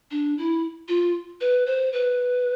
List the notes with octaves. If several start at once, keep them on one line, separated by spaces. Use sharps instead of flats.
D4
E4
F4
B4
C5
B4